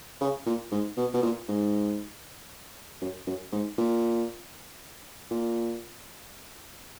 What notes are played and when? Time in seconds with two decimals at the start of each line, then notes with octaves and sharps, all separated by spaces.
0.21 C#3
0.46 A#2
0.72 G#2
0.97 B2
1.14 B2
1.23 A#2
1.48 G#2
3.01 F#2
3.27 F#2
3.52 G#2
3.78 A#2
5.31 A#2